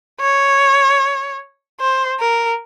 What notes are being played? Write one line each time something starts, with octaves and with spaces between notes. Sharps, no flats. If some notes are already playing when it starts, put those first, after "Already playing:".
C#5
C5
A#4